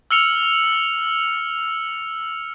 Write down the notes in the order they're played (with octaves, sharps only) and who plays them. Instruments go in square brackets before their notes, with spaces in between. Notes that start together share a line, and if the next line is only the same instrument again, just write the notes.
[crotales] E6 F6 C#7 F7 F#7